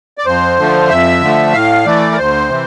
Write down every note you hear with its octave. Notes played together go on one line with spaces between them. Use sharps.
D5
F2 C5
D3 F3 A3
F2 E5
D3 F3 A3
A2 F5
E3 A3 D5
A#4
D2 C5
C3 E3